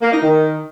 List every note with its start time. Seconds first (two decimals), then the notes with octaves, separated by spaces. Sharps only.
0.02 A#3
0.12 D#4
0.22 D#3